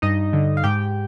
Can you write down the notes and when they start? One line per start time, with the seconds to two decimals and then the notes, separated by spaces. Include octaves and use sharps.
0.02 G2 D#4 D#5
0.33 D3
0.57 F5
0.64 G#2 G4 G5